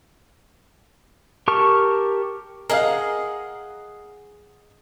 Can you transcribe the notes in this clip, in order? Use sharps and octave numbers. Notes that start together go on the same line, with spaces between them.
G4 A#4 A5 C#6 F6
G#4 A#4 D#5 F5 F#5